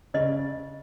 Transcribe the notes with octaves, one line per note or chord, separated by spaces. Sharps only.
C#3 D#5